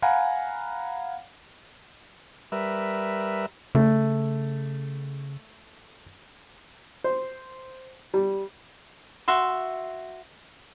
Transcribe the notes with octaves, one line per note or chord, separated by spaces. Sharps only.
F5 F#5 G#5 A#5 B5
G3 A#4 B4 E5
C#3 A3
C5
G3
F#4 E5 C6